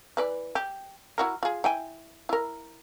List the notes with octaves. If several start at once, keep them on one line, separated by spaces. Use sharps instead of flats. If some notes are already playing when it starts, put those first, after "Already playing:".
E3 B4 D5
G4
E4 F#4 A#4
F4 G#4
E4 G5 G#5
E4 A#4